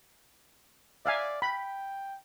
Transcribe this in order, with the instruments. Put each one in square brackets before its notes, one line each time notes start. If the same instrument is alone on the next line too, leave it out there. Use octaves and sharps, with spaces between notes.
[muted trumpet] D5 [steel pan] E5 F5 G#5
[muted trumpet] G5 [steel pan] B5